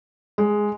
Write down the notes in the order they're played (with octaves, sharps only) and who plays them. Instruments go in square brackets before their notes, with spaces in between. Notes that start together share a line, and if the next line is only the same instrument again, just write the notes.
[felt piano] G#3